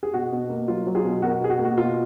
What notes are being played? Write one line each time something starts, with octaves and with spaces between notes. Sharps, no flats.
G#4
B2 F#4
B2
A#3
F#3 F4
F#3
F4 G#4
B2
B2 F#4 A#4
B2 G#4
F#4
A#3
F#4
B2 F4